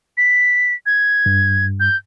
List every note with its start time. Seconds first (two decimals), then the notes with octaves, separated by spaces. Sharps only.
0.18 B6
0.86 G#6
1.26 G2
1.80 G6